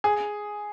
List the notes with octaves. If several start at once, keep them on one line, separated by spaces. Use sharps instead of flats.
G#4